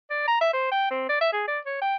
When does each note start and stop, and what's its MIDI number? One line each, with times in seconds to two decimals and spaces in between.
0.10 0.23 74
0.28 0.36 82
0.41 0.49 76
0.53 0.67 72
0.72 0.89 79
0.91 1.05 60
1.09 1.20 74
1.21 1.32 76
1.33 1.44 68
1.48 1.59 74
1.66 1.80 73
1.82 1.96 79